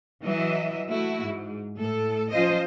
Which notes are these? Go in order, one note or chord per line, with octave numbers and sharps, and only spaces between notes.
E3 F#3 D#5 E5
A3 E4 F#4
G#2
A2 A4
F3 C#4 F4 C5 D#5